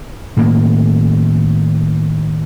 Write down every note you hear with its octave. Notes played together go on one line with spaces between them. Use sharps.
A2 D#3 A#3